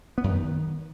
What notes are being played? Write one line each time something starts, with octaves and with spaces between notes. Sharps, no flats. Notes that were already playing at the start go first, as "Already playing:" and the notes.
B3
F#2
D#3